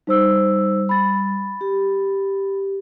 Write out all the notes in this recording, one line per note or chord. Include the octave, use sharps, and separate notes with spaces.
G3 D#4 C5 E6
B5 A6
G4